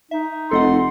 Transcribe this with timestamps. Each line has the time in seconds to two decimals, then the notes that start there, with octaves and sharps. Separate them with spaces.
0.11 D#4 E5
0.51 F1 A4 D#5 F#5 C6